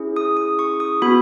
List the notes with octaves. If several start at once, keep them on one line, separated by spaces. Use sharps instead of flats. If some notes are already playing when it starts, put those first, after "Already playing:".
Already playing: C#4 E4 G#4
D#6
D#6
C#6
D#6
B3 F#4 B5